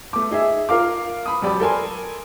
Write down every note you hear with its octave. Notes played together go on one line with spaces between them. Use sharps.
A3 D6
D#4 G#4 E5
F4 A#4 F5 D6
B5 D#6
E1 F#2 F#3 G4 D5 B5
A4 A#4 G#5 C6